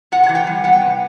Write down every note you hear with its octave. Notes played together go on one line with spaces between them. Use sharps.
C3 F#5
F#5
E3
G5
G3
B3 F#5
G5
C3